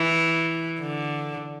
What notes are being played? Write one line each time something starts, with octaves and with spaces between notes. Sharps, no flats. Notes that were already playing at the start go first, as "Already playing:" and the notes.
Already playing: E3
D3